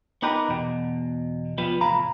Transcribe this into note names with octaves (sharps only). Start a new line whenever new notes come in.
B3 D#4 G4 A#4 B4
E2 B2
C2 F3 G3 B3
E2 A2 C3 F5 A#5 B5